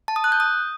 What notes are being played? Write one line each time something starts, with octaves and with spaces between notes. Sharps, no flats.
A5
D#6
F#6
G6
D#6